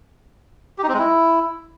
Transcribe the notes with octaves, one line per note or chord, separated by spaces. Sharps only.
G4
D#4
C4
G#3
E4